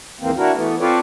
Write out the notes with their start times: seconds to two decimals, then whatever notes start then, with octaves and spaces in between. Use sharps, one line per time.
0.21 D#2 G#2 E3 A#3 C4
0.37 D4 E4 F#4 A#4
0.54 E3 A3 B3
0.80 C4 F4 A4 B4 C#5 D5